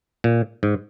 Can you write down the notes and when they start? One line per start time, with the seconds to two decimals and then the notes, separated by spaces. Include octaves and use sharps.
0.24 A#2
0.63 G#2